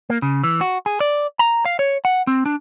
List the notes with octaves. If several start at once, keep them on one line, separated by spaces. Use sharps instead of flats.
A#3
C#3
E3
F#4
G#4
D5
A#5
F5
C#5
F#5
C4
D4